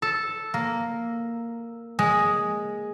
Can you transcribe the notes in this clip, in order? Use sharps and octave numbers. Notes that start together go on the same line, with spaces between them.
A4
A#3
G#3